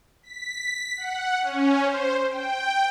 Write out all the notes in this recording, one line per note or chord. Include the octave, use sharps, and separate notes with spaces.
B6
F#5
C#4
C5
G5